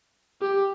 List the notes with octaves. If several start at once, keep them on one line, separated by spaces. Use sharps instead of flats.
G4